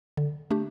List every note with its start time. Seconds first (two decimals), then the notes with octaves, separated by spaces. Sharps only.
0.17 D3
0.51 A3 D4 G4